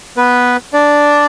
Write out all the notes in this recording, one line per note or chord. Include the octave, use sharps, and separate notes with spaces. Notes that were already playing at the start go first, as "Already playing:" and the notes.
B3 B4
D4 D5